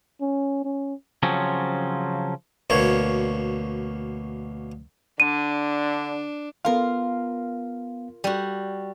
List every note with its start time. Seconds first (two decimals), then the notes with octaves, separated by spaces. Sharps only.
0.21 C#4
0.65 C#4
1.23 C#3 F3 F#3 C4 C#4
2.70 D2 B2 A#3 C#5
5.20 D3 D4 D#7
6.65 B3 F4 A#4 F5
8.24 G3 F#4